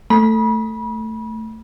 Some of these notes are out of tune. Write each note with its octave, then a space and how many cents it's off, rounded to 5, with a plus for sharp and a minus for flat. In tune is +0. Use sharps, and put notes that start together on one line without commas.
A3 +10 B5 -35